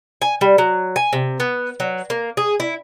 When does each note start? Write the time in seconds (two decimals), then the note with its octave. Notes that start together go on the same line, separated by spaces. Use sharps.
0.22 G#5
0.41 G3
0.58 F#3
0.96 G#5
1.13 C3
1.40 B3
1.80 F#3
2.10 A#3
2.37 G#4
2.60 E4